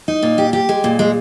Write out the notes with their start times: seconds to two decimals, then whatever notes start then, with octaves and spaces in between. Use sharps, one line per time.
0.08 D#4
0.22 A#2
0.38 G4
0.53 G4
0.69 G#3
0.84 A#2
0.99 G#3